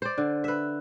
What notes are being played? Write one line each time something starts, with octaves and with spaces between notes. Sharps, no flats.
C5 D5
D3
B4 E5